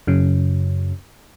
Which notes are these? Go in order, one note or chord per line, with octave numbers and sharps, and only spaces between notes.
F#2 C#3